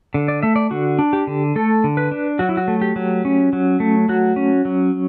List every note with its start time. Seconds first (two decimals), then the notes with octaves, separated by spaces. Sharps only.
0.14 D3
0.28 D5
0.43 A3 E5
0.56 D5
0.71 D3 F#4
0.99 D4
1.13 G4
1.27 D3
1.56 A3 A4
1.84 D3
1.97 B4
2.11 D4
2.39 F#3 F#4
2.49 E4
2.57 F#4
2.68 A3
2.81 G4
2.96 F#3
3.25 C#4
3.53 F#3
3.80 A3
4.09 F#3 F#4
4.36 C#4
4.65 F#3